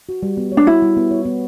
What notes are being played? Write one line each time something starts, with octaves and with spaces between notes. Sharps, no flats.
F#4
G3
B3
C#5
D4
E4 F#4
G3
B3
C#5
B3